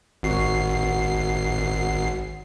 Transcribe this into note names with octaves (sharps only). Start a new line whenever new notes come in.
G#1 F#4 C7